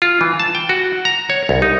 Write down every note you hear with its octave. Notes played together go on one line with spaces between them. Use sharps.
F4
E3
A5
G5
F#4
A#5
C#5
C2
D#4